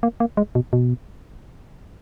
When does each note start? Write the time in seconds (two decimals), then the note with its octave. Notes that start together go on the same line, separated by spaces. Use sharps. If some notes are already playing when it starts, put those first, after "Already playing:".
0.03 A#3
0.20 A#3
0.37 G#3
0.55 B2
0.73 B2